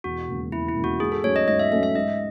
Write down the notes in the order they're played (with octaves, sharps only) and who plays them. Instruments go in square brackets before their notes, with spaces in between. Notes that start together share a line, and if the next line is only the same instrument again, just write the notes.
[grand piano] E1 [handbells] F#4
[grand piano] D#2 C#3 G#3
[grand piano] E1 [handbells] E4
[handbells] E4
[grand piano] D#2 C#3 G#3
[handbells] F#4
[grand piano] G#2 [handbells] G#4
[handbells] A4
[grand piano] F#3 A3 C#4 [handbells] C#5
[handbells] D#5
[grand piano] G#2 [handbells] D#5
[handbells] E5
[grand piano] F#3 A3 C#4 [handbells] E5
[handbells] E5
[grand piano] G#2 [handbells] D#5